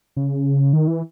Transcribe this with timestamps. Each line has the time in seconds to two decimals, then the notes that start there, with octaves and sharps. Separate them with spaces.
0.16 C#3
0.73 D#3
0.87 E3